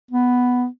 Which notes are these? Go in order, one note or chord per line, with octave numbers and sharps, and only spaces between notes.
B3